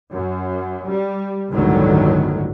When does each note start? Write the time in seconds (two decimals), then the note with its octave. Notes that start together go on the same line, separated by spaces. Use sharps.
0.13 F#2
0.89 G3
1.52 G1 C#2 A2 D3 D#3 F#3